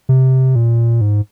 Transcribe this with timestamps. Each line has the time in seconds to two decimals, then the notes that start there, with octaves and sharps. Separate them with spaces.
0.09 C3
0.56 A#2
1.01 G#2